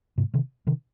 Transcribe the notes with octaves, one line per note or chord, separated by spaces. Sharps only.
G#2 C3
C3 D#3
C3 D#3